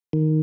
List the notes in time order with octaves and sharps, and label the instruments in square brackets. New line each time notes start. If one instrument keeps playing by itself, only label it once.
[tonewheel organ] D#3